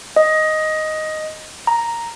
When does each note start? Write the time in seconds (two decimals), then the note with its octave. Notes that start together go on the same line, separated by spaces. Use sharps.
0.16 D#5
1.67 A#5